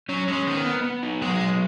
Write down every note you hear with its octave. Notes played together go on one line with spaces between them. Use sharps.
F#3 C#4
G#3 C#4
D#3 B3
B3
B3
D#4
F#3 G#3
B3